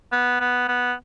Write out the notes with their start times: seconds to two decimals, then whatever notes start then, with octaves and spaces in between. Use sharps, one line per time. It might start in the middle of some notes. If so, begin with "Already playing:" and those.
0.12 B3
0.40 B3
0.68 B3